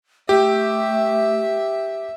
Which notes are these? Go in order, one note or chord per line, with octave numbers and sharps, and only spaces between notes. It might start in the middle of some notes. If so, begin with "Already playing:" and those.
A3 G4 E5